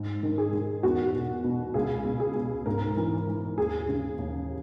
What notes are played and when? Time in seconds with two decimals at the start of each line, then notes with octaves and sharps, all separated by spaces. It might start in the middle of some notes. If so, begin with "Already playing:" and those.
Already playing: G#2
0.23 D#3
0.38 G#4
0.53 D#3
0.83 E2 F#4
1.13 B2
1.44 B2
1.74 C#2 G#4
2.05 B2
2.20 G#4
2.35 B2
2.66 G#2 A#4
2.97 E3
3.27 E3
3.58 D#2 G#4
3.89 C#3
4.18 D#2